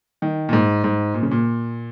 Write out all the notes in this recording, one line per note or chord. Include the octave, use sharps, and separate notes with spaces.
D#3
A#2
G#2
G#2
A#2
C#3
A#2